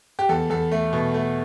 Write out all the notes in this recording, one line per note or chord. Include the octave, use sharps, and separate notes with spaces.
G4
E2 A4
E2 A4
A3
B2
A3